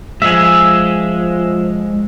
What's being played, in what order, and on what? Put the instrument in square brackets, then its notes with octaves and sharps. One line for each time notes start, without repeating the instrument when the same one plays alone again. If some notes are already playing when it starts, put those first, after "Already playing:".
[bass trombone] F3 [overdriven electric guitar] G#3 [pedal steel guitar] E5 G#5